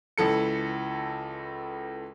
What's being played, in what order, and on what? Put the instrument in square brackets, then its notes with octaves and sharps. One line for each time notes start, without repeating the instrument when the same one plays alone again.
[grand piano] C#2 E3 A4 C#7